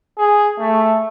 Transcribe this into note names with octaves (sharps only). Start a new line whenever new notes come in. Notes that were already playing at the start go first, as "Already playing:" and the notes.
G#4
A3